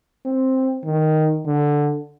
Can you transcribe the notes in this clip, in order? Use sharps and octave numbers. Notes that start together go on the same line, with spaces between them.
C4
D#3
D3